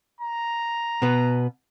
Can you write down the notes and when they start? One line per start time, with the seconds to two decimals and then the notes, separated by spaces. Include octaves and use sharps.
0.21 A#5
1.02 B2 B3